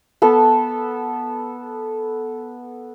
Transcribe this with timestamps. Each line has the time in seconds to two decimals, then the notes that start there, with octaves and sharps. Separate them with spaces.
0.22 B3 A4